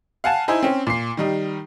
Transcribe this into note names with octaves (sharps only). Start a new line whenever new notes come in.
F5 F#5 G#5 A5
D#4 E4 C5 G#5
C4 C#4
A#2 C7
D#3 G3 D#4